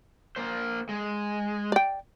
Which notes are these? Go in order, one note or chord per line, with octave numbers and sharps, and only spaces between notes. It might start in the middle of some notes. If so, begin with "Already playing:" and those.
A#3 C5
G#3
D5 G5